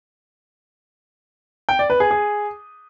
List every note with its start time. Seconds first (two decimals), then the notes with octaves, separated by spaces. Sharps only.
1.69 G5
1.79 D5
1.90 B4
2.00 G#4
2.11 G#4